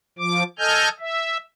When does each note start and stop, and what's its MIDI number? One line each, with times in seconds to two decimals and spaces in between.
0.19 0.43 53
0.19 0.43 86
0.59 0.89 69
0.59 0.89 75
0.59 0.89 80
0.59 0.89 89
0.59 0.89 91
1.00 1.37 76